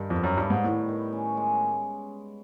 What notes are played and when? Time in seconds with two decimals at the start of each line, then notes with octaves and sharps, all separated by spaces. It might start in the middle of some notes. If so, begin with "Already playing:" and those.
Already playing: G2 D#3 G3
0.10 F2
0.16 B3
0.24 F#2
0.37 G2 G3
0.50 G#2
0.64 A2 D#3
0.89 D#3
1.13 C#4
1.37 G#3